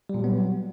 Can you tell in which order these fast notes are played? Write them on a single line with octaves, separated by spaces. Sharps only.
G3 A#2 F#3 B3